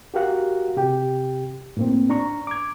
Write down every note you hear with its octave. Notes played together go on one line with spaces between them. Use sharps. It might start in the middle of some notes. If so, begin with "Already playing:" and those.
F#4 G4 A#4 F5 F#5
C3 G4 G5
A2 A#3 C4
D4 A#5 C#6
D6 G#6